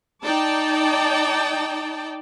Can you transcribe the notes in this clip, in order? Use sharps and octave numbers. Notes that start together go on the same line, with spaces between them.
D#4 D5 G5 A5